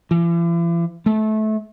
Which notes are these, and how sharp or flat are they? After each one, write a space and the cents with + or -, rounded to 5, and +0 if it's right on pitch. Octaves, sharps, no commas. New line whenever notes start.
E3 +45
A3 -25